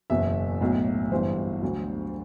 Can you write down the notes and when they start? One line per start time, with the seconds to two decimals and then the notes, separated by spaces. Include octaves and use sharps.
0.10 F#1 E2 B2 E5
0.61 B1 A2 F#3
1.11 G1 G2 E3 C5
1.62 D2 D3 F#3